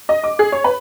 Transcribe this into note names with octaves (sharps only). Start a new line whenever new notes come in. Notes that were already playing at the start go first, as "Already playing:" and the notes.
D#5
D6
G#4
C#5
B4